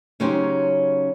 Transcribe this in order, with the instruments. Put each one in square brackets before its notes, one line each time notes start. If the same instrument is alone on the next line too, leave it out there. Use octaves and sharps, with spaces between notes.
[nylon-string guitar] C#3 F#3 C#4 D#4 G4 C5